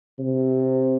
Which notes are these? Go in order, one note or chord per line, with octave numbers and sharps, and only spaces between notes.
C3